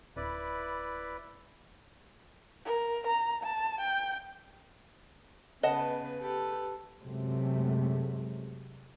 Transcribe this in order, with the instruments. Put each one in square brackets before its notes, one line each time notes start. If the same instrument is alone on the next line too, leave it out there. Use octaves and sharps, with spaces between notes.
[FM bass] D1 [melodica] E4 B4 D5
[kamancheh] A#4
A#5
A5
G5
[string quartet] C#3 B3 B4 [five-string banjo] D#5 F#5 A5
[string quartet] G4 A4 B4
[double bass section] F#2 C3 F#3 G#3 A3